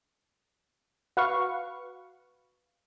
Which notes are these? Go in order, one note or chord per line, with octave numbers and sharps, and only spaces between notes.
F#4 B4 F5 C#6